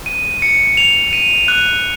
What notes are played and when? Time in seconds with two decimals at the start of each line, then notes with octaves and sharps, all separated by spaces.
0.06 D#7
0.42 C#7
0.77 F7
1.13 D#7
1.48 F#6